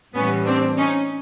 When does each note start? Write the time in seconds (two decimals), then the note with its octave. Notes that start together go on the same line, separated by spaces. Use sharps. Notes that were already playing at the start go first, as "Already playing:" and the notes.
0.14 A2 E3 G3 B3 C#4
0.46 C4 D4
0.77 C#4 D#4